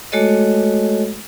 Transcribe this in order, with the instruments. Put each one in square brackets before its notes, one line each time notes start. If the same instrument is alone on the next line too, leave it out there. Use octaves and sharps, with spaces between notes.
[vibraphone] G#3 A3 F#4 A4 C#5 D#5